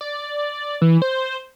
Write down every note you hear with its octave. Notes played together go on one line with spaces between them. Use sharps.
D5
E3
C5